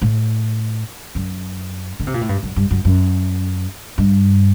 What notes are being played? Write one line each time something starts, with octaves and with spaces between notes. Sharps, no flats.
A2
F#2
D3
C3
A#2
A2
G2
F#2
G2
F#2
F#2
G2